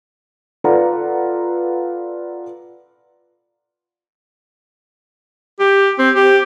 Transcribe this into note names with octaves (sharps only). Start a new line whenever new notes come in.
F4 A4 B4 D5 F#5 A#5
G4
C4
G4